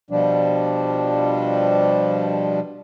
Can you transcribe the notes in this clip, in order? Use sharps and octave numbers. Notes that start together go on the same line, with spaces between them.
B2 F3 G3 D4